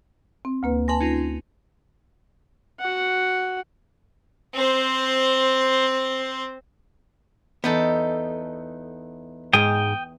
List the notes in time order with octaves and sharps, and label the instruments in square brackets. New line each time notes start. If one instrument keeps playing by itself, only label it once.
[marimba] C4
D2 A#3 B4
[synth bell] B4 C6 A#6 [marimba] G#5 A5
[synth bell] C#4 D#4 F4
[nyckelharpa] F#4 F#5
[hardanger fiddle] C4 C5
[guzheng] E2 D#4 A4 [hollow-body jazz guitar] B3
[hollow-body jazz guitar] G#2 G#3 [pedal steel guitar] G5 D#6